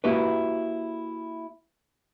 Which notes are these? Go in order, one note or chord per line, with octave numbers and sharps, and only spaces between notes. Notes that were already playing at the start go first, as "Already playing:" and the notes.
A#3 E4 F#4 G4 B4